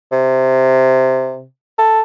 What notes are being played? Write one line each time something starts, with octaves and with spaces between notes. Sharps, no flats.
C3
A4